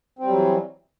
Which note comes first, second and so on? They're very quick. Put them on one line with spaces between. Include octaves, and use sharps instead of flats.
C4 G3 F#3 E3